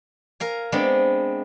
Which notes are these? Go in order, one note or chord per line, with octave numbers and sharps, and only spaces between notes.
A#4 F5 G#5
G#3 B3 C4 D4